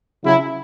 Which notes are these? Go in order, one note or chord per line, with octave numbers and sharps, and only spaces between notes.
C#3 F#3 E4